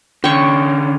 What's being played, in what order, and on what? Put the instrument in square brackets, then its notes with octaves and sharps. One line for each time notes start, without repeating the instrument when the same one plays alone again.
[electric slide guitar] D3 C#4 [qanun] G5 C#6